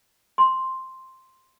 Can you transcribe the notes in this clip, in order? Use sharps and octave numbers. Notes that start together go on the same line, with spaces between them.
C6